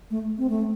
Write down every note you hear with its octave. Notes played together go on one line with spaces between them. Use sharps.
A3
C4
A3